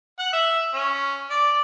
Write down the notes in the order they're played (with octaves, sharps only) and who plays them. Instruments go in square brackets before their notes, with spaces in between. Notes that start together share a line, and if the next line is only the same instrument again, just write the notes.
[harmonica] F#5
E5 E6
C#4
D5